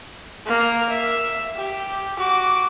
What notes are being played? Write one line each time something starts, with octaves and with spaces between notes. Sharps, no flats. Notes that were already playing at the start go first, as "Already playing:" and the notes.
A#3 A#4
E5
G4
F#4 D6